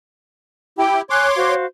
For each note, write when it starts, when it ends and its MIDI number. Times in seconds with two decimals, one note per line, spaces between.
0.78 1.01 64
0.78 1.01 67
0.78 0.99 79
1.10 1.54 73
1.10 1.28 80
1.10 1.54 84
1.10 1.54 86
1.10 1.28 90
1.36 1.65 66
1.36 1.65 72
1.36 1.65 77